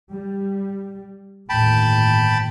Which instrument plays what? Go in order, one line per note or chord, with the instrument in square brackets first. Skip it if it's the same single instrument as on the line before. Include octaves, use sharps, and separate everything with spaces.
[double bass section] G3
[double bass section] G1 D#2 A2 [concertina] G5 A5 B5